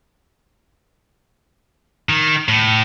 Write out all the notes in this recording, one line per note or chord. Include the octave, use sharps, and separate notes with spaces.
D#3
A2